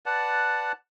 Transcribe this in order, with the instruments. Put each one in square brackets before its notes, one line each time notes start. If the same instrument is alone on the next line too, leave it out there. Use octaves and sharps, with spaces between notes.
[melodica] B4 D5 F#5 A5